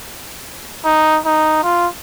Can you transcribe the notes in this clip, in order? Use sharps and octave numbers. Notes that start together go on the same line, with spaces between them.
D#4
D#4
F4